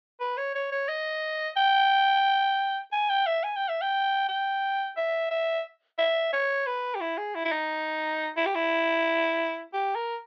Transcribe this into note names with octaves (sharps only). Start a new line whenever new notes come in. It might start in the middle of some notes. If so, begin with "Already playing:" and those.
B4
C#5
C#5
C#5
D#5
G5
G#5
G5
E5
G#5
G5
E5
G5
G5
E5
E5
E5
C#5
B4
G4
E4
G#4
E4
E4
D#4
E4
G4
E4
G4
A#4